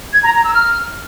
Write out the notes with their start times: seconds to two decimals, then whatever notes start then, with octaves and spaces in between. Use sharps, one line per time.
0.13 G#6
0.23 A#5
0.33 A#5
0.44 E6
0.54 F6